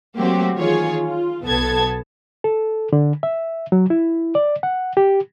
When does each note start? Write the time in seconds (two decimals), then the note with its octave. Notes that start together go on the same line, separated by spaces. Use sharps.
0.18 F#3 A3 A#3 C4 F#4 G4
0.55 D#3 E3 F4 G#4 C#5
1.03 F4
1.43 B1 B3 A4 A5 G#6
2.44 A4
2.93 D3
3.23 E5
3.72 F#3
3.90 E4
4.35 D5
4.63 F#5
4.97 G4